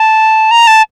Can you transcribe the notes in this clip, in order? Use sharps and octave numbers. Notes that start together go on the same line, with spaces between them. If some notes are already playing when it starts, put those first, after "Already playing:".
Already playing: A5
A#5
A5